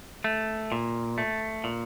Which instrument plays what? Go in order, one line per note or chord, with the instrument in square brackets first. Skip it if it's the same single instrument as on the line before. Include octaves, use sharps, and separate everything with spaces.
[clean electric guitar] A3
A#2
A3
A#2